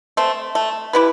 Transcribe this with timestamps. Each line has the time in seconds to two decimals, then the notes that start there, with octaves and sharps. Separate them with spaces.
0.17 A3 C4
0.55 A3
0.93 E4 G4 B4